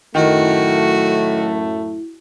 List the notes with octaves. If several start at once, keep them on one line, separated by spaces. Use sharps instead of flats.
F#2 A2 D#3 A3 E4 F#4